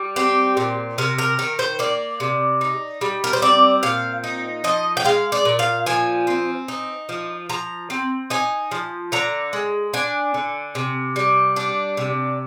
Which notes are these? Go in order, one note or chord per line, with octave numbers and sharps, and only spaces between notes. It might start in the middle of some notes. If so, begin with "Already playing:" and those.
Already playing: G3
C4 G4
A#2
C3 A#4
A#4
D#3 A#4
C5
A#3 D5
C3
D#4
G3
A#4
C5
C4 D5
A#2 F5
D#4
F3 D#5
G5
G#3 F5
D5
A#2
F5
F3 G#5
C4
D#4
F3
F3 A#5
C4
D#4 G#5
F3
D3 A#5
G#3
D4 G#5
D3
C3
G3
D4
C3